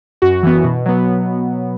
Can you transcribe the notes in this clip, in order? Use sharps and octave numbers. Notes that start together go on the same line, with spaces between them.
F#2 F#4
E3 B3
B2
F#3 B3